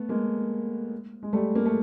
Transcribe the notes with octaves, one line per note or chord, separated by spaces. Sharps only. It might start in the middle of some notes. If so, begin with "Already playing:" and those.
Already playing: A3 B3
G#3 A#3
G#3
G3 A3
A#3
A3